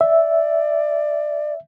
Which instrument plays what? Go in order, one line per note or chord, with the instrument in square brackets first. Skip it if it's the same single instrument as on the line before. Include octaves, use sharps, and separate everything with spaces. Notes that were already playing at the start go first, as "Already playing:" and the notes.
[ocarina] D5 [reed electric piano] E5